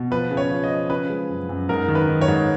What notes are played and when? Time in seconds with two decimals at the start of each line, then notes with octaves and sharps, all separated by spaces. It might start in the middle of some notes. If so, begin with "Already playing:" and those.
Already playing: B2
0.11 F3 B4
0.31 C#3
0.37 C#5
0.51 F3
0.64 D#5
0.70 F3
0.90 C#3 B4
1.10 G#3
1.30 F#2
1.49 F#2
1.69 G#2 A#4
1.88 D#3
1.95 B4
2.08 D#3
2.21 C#5
2.28 G#2